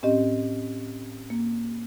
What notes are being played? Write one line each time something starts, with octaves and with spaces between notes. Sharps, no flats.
A2 C4 C#4 G4 D#5
A#3